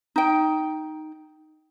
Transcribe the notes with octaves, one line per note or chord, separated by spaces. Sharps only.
D#4 G5